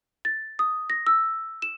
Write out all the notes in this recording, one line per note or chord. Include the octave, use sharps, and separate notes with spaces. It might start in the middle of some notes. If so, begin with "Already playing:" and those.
A6
D#6
A#6
E6
E7